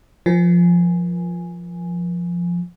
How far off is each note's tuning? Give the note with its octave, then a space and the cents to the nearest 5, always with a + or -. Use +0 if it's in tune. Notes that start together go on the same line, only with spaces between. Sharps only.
F3 +0 A#4 +45 G#5 +0